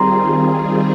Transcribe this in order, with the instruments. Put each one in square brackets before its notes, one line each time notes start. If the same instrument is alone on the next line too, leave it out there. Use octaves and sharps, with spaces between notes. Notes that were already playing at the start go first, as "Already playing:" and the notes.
Already playing: [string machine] D#3 G3 C4 F4 G#4 [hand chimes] A#5 C6